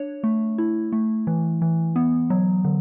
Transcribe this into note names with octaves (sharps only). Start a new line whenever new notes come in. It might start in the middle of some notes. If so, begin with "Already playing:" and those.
Already playing: D4 C#5
A3
E4
A3
E3
E3
B3
F#3
D3